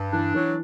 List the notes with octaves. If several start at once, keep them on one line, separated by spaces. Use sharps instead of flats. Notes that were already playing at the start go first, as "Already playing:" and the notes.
Already playing: G2
E3 D4
E3 F#3